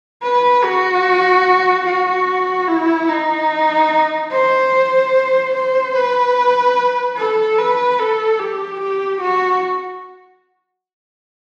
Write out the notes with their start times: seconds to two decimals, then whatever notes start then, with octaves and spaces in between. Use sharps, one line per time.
0.23 B4
0.64 F#4
1.86 F#4
2.68 E4
3.08 D#4
4.32 C5
5.54 C5
5.95 B4
7.16 A4
7.58 B4
7.99 A4
8.39 G4
8.80 G4
9.21 F#4